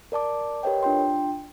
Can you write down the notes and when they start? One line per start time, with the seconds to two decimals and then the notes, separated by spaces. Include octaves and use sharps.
0.12 A#4 D5 A5 D6
0.63 G4 A#4 B4 C#5 D#5 G5
0.83 D4 F4 G5 C6